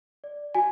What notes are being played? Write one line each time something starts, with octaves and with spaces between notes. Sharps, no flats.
D5
F#4 G#5